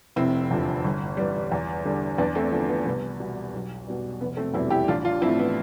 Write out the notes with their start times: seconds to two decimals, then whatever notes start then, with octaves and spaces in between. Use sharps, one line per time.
0.16 F1 C4 E4
0.51 E2 D3 F3
0.84 G1
1.17 G2 E3 G3
1.52 E2
1.85 D3 G3
2.18 E2 B3 D4
2.35 A3 C4
2.52 D3 F3 B3
2.69 B3
2.85 C2 B3
3.20 B2 G3
3.53 B1
3.87 B2 G3
4.21 F1 B3
4.37 A3 C4
4.54 E2 B2 G3 C4 E4
4.71 E4 G4
4.88 A1 D4 F4
5.04 D4 F4
5.21 F3 C4 E4
5.26 A2
5.39 B3